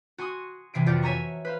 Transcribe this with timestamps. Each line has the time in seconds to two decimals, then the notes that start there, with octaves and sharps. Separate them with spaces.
0.18 F#4 G#5 C6 C#6 D#6
0.74 C2 C3 E3 C7 D7
0.86 F2 F4 G4 D5 F#5 G6
1.02 C#5 E5 G#5 A#5 C#6
1.45 B4 C5 F5